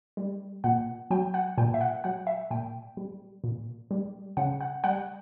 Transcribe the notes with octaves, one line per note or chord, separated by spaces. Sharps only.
G3
A#2 F#5
F#3 G5
F#5
A#2 G5
E5
F#5
F#3 F#5
E5
A#2 G5
G3
A#2
G3
C#3 F#5
F#5
G3 F#5